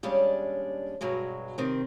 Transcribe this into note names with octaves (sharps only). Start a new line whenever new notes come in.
D#2 G3 G#3 C#4 D4
G2 B2 F#3 G#3
C3 D#3 C4